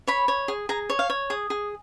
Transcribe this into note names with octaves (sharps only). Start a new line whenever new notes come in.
C#5 B5
C#5
G#4
G#4 A#5
C#5
F5
C#5
G#4 D#6
G#4